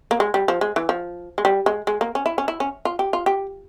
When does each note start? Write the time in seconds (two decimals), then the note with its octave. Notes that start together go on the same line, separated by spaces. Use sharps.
0.11 A#3
0.20 G#3
0.34 G3
0.48 F3
0.61 G#3
0.76 E3
0.89 F3
1.38 G#3
1.45 G3
1.66 G#3
1.87 G#3
2.01 A#3
2.15 C#4
2.26 E4
2.38 C#4
2.48 E4
2.60 C#4
2.85 F4
2.99 G4
3.13 F4
3.26 G4